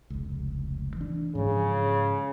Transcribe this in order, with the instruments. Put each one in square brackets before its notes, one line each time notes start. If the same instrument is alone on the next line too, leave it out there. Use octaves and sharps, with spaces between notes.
[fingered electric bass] F1 C#2
E3 D4
[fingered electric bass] G#2 F3 [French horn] C#3